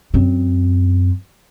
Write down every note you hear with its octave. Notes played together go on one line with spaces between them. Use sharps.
F#2 C4